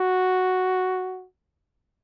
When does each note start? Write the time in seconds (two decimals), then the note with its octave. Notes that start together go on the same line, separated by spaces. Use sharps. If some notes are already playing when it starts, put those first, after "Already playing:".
Already playing: F#4